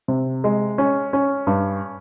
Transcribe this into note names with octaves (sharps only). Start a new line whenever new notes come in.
C3
G#3
C#4
C#4
G2